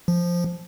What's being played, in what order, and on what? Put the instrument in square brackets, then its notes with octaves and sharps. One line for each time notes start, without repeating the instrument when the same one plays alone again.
[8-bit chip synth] F3